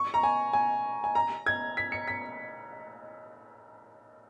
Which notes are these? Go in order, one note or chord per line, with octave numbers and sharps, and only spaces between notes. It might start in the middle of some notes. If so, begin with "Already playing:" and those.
Already playing: C#6
A#5
G#5
G#5
G#5
A#5
G#6
B6
C#7
B6